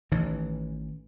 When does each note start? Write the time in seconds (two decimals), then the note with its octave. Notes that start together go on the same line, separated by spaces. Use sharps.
0.11 A1 D#3 E3